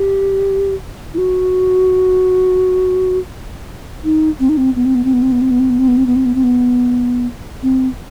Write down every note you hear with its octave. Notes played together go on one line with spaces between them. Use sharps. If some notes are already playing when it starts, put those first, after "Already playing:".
Already playing: G4
E4
F#4
D#4
C4
D#4
C4
B3
C4
B3
C4
B3
C4
B3
C4
B3
C4
B3
C4
B3
C4
B3
C4
B3
C4
B3
C4